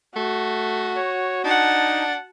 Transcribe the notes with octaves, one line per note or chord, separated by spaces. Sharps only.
A3 F#4
C#5
D4 D#4 F#5 A5